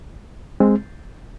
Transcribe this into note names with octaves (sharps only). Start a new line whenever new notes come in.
G#3 C4